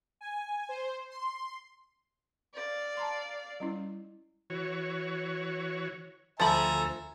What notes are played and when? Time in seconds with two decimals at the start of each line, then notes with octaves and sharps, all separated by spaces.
0.21 G#5
0.69 C5
1.10 C6
2.56 D5 F5
2.97 A5 A#5 C6
3.60 G3 C#4 E4
4.50 E3 F#4 C#5
6.40 D2 F3 A4 E5 G#5 A#5 B5